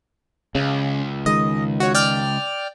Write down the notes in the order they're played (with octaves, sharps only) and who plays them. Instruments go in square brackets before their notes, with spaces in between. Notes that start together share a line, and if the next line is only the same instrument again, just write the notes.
[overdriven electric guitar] C#2 [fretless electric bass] C#3
[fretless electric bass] D#3 G#3 [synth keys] D#5
[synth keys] F#4 C#5
D5 G5 F6